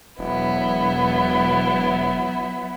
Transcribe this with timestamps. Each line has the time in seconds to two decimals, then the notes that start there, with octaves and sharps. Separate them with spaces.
0.19 E1 F#3 B3 E4